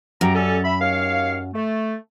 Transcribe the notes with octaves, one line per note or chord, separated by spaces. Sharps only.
F#2 G4 A#5
G3 C#4 A4
E5 B5
D#2 C#5 F5
A3